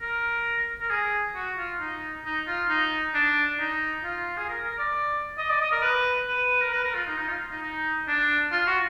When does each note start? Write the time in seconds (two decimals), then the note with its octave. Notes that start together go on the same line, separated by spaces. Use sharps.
0.01 A#4
0.81 A#4
0.90 G#4
1.35 F#4
1.58 F4
1.80 D#4
2.25 D#4
2.47 F4
2.69 D#4
3.14 D4
3.60 D#4
4.04 F4
4.37 G#4
4.49 A#4
4.64 A#4
4.79 D5
5.38 D#5
5.49 D5
5.61 D#5
5.72 A#4
5.82 B4
6.28 B4
6.61 A#4
6.73 B4
6.84 A#4
6.95 F4
7.07 D#4
7.17 D#4
7.29 F4
7.51 D#4
7.62 D#4
8.08 D4
8.52 F4
8.67 F#4